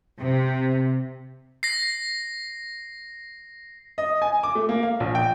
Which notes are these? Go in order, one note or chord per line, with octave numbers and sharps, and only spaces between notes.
C3
A#6 C7
D#5
G#5
D6
A3
A#3
F5
A#1
G5